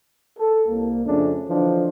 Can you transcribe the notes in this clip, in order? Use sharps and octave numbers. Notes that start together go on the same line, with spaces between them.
A4
C2 A#3
F2 C#3 A3 C#4 D4
D3 E3 F3 D4 D#4